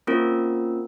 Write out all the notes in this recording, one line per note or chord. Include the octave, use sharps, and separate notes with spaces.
A#3 C4 C#4 F4 A#4